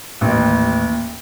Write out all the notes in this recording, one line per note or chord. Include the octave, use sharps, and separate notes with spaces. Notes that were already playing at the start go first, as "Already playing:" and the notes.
A1 D#2